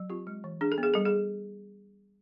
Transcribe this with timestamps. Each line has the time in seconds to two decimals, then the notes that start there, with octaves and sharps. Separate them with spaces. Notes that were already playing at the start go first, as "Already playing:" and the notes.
Already playing: F#3
0.10 C4 F4 G4
0.27 G#3
0.44 E3
0.61 D4 G#4
0.72 A4
0.78 B3
0.83 G#4
0.94 G3 A4
1.05 G#4